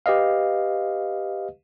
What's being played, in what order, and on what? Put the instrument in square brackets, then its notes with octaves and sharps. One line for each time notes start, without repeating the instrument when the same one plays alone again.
[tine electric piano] G4 B4 D#5 F5